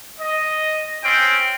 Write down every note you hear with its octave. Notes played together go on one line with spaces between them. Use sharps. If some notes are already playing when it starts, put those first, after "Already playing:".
D#5
C4 C#4 G5